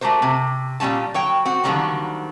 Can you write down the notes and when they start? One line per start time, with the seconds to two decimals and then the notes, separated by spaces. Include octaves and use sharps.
0.01 A3 F#4 G4 A#4 C5
0.22 C3
0.80 A#2 G3 C4 C#4 A5
1.14 F#3 C#5 G5
1.45 C4 F#4
1.64 D3 D#3 F#3 G3 A#3 C4